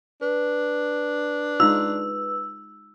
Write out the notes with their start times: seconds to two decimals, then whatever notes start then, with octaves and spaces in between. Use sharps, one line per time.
0.21 D4 B4
1.60 G#3 D#4 F4 E6